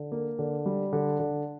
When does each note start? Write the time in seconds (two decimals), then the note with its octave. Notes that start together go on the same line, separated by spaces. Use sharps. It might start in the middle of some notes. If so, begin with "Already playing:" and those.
Already playing: D3
0.12 A#3
0.39 D3
0.66 G3
0.93 D3
1.20 D3